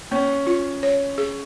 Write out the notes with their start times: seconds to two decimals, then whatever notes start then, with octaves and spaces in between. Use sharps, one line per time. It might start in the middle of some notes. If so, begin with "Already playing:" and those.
0.11 A#3 C#4
0.47 F4
0.83 C#5
1.18 G#4